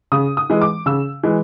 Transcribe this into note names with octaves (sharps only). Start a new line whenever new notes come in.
C#3 D#6
D#6
E3 G#3
D6
C#3 E6
E3 G#3